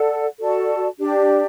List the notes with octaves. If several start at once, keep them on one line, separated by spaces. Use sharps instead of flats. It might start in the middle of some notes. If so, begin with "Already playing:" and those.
Already playing: A4 D5 F#5
F#4 A4 D5 A5
D4 G4 D5